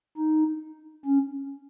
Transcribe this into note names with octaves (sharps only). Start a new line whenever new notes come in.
D#4
C#4